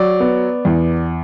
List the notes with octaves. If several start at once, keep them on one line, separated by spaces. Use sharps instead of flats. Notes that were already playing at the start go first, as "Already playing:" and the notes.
Already playing: F#3 D5
B3
E2